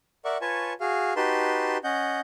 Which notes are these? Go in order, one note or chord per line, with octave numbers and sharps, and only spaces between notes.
A#4 D5 E5 F#5 C#6
F4 B4 C#5 G#5 A5 C#6
F#4 G#4 F5
D#4 F#4 G4 B4 A5 C6
C#4 D#5 F#5 G6